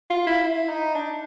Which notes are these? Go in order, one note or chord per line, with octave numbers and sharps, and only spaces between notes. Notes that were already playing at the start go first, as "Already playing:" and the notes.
F4
E4
E4
D#4
D4